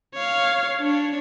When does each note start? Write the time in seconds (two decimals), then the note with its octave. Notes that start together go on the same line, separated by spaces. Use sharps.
0.14 C#5 F5
0.80 D4 C#5